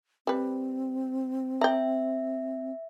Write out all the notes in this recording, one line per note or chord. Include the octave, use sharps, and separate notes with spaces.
G3 C4 B4
E5 G5 A#5